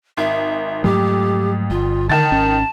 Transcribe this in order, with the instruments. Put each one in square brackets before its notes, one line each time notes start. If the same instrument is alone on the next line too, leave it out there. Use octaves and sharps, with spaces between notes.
[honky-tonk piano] G#1 [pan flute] E5
[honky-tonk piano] F2 [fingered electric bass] G#2 F#3 A3 [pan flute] G4
[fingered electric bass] G1 [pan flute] F4
[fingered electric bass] D3 [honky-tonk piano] D#3 A6 [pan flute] A5
[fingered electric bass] G#1 C#4